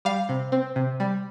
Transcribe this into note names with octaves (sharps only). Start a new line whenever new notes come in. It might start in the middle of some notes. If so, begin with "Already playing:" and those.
G3 F5
C3
C4
C3
G3